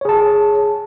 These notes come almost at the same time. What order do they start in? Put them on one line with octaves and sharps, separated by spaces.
C#5 G#4 A5